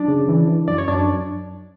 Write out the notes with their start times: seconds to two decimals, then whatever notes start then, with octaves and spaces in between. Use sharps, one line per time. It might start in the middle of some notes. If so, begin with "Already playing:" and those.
Already playing: F#2 D4 D5
0.08 C#3
0.28 E3
0.48 E3
0.68 F#2 D5
0.78 C#5
0.88 F#2 D4 D5